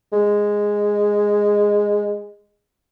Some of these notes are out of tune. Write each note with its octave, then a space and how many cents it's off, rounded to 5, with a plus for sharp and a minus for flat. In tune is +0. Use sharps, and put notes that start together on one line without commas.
G#3 -10